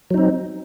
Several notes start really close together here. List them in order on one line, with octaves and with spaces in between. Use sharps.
F#3 D#4 C4